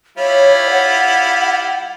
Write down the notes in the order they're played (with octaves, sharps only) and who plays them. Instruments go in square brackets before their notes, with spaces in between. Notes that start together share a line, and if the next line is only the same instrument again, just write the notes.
[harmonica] G3 E4 F4 [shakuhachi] C#5
[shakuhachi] F#5